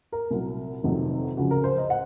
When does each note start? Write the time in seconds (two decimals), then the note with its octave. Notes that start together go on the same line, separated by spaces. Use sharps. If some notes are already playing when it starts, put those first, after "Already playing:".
0.12 A#4
0.30 C2 A#2 F#3
0.83 F1 F2 C3 D#3 F#3
1.37 C#2 C#3 F3 F#4
1.51 A#4
1.64 C5
1.78 D#5
1.90 F#5